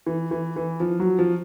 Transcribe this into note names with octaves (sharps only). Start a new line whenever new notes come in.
E3
E3
E3
F3
F#3
F3